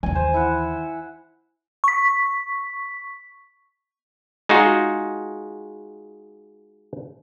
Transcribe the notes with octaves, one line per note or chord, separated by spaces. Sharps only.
D#2 E3 G#5
C5
E4 F#5
C#6 B6
G#3 D#4 F4 F#4 G#4